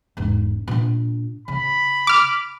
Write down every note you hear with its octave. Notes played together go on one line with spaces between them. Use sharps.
E1 G#2
A#2 D4
C#3 B5
D6 F6